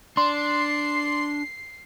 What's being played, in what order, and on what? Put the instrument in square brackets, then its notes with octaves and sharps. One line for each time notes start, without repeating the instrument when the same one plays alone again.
[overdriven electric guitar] D4 [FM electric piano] C6 [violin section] C7